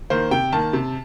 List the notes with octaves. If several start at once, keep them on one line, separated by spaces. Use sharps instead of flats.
D#3 A#3 C5
C3 G5
D#3 A#3 A5
C3